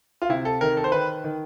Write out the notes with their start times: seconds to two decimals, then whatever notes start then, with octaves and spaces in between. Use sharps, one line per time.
0.22 F4
0.29 C3 E4
0.45 A4
0.61 D#3 A#4
0.77 A4
0.84 C5
0.92 D#3 B4
1.24 D#3